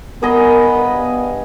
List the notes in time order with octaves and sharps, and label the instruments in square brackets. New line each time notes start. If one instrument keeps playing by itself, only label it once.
[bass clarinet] B3 [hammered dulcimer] G#4 D#5 [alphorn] A#4
[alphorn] G2